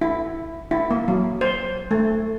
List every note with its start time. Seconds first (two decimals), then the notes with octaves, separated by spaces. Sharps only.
0.01 E4
0.71 E4
0.91 A#3
1.08 F#3
1.41 C5
1.91 A3